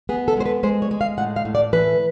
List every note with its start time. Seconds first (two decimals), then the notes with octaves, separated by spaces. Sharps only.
0.09 B3 G#4
0.28 A4
0.37 G#3 C5
0.46 B4
0.63 G#3 C5
0.82 C#5
0.91 G#3
1.01 F5
1.18 A2 F#5
1.36 F5
1.45 A2
1.55 D5
1.73 E3 B4